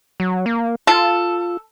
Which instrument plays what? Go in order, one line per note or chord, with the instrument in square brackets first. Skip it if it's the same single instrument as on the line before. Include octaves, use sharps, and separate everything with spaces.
[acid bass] F#3
A#3
[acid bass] F4 [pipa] A4